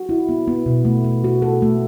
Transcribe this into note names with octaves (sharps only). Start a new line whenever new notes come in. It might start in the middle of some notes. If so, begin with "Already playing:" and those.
Already playing: F#4
E4
B3
B3
B2
A3
A3
F#4
A4
A3